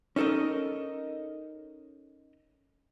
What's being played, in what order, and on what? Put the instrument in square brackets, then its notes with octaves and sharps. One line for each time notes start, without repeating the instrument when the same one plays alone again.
[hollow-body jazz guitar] C#4 D#4 A4 A#4 D#5